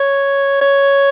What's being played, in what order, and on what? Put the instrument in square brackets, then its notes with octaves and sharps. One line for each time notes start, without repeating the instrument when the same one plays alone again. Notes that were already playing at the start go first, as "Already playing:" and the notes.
Already playing: [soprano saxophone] C#5
C#5